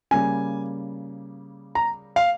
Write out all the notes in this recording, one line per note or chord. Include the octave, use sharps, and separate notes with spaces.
C#3 G3 A#3 G#5
A#5
F5